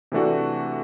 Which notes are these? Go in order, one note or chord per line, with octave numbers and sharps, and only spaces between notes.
C3 E3 A3 D4 F#4